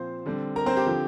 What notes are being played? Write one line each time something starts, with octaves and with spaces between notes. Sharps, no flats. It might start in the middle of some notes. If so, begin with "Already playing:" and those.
Already playing: A#2 F3 C4 C5
D3 G3 C4
A#4 A#5
C4 C5
G4
D3 F3 C4